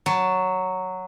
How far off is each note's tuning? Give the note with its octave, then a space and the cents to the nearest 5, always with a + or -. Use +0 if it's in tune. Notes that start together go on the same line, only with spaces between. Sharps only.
F#3 +0 A5 +0